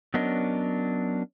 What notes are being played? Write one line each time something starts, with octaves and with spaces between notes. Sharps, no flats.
F#3 B3 C#4 D4 A#4 D#5